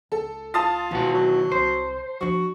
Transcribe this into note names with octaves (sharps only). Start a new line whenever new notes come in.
C#2 A4
F4 A5 D#6 A6
E2 B2 D#3 E3 F#4
F#3
C2 C5
F3 D4 F#4